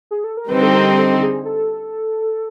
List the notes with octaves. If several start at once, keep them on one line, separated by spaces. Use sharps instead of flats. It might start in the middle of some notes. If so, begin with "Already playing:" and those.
G#4
A4
A#4
D3 G3 C4 D#4 B4
A4
A#4
A4
G#4
A4